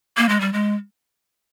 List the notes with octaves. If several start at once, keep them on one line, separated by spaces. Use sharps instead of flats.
A#3
G#3
G3
G#3